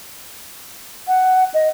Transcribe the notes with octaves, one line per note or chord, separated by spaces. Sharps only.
F#5
D#5